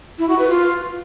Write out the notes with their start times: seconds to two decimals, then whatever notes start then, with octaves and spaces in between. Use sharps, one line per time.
0.18 E4
0.29 F#4
0.39 B4
0.49 F4